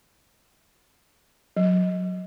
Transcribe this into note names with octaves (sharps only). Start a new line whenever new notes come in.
F#3